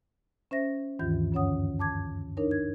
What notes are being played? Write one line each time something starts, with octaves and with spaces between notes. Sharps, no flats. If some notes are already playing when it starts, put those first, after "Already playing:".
C#4 C5 E5 A#6
D2 G2 D#3 E3 F4 G6
F#2 D3 C#4 C#5 F#5 D#6
A5 D6 G#6
D4 D#4 A#4 C#5
G#6